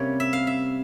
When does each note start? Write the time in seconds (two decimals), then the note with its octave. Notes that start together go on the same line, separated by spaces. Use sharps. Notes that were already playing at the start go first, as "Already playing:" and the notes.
Already playing: C3 G3 A#3 C#4 C#5
0.20 E5
0.33 F5
0.47 E5